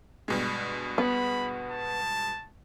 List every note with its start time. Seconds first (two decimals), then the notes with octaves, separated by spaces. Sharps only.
0.28 G2 B2 G#3
0.98 B3 B5
1.72 A5